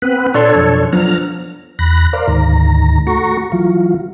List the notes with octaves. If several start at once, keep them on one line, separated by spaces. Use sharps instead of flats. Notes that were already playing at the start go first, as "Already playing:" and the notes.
B3 C4 B4
A#2 D4 A4 C#5 D5 C6
B1 F2
F3 F#3 B3 D4 A#5 F6
E2 B5 F#6 A#6
A#4 C5 D5 F5
D2 G#2 D#3 A#5
A3 F#4 A#5 C#6
E3 F#3 F4